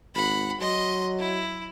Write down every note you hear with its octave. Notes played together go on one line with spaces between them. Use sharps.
G#1 F#5 B5
F#3 D#5 C6
E4